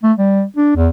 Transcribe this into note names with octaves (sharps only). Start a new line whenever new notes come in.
A3
G3
D4
E2